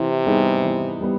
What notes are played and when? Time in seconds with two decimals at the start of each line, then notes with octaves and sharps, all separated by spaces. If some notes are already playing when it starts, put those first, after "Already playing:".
Already playing: C3 E3
0.26 G3 B3 D#4 G#4
0.64 E3
1.01 G3 B3